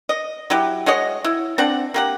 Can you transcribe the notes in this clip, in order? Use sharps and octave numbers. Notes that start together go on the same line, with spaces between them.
D#5
F#3 E4 G4
G#3 F#4 C#5 D#5
E4
C4 D4 F#5
A#3 G4 F#5